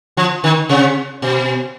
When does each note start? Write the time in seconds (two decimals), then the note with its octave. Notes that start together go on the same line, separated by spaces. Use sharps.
0.17 F3
0.44 D#3
0.69 C3
1.22 B2